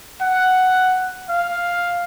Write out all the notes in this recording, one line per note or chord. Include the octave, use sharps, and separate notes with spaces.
F#5
F5